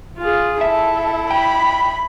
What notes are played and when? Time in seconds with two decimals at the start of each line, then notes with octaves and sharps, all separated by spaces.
0.18 F4 G#4
0.61 E4 A4 E5
1.31 G5 B5